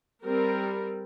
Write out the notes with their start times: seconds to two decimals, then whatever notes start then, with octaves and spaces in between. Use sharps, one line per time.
0.24 G3 C4 A#4